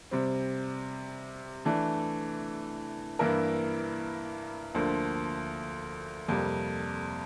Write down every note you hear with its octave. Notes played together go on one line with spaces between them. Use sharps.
C3 G3 C4
E3 A3 D4
G2 E3 A#3 E4 A#4
D2 D3 F3 A#3
F2 C3 G3 A#3